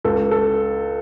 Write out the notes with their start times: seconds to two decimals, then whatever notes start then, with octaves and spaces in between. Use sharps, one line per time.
0.04 C#2 A4
0.31 A4